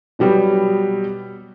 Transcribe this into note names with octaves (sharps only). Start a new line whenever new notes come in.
B2 F#3 G3 B3 G4